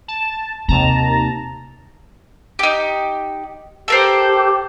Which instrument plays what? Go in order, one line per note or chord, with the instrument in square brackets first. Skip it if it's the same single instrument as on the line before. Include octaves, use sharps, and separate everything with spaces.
[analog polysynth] A5
[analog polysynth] D#2 A5 A#5 [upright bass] C3
[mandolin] D#4 G4
[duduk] G4 [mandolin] A4 A#4 C5